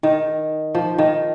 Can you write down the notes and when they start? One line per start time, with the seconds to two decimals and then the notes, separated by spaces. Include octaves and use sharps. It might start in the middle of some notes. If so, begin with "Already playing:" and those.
0.03 D#3
0.75 F3
0.98 D#3